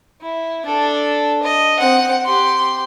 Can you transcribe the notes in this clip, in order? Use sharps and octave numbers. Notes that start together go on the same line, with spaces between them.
E4
D4 A4
D#5
C4 F#5
G4 C6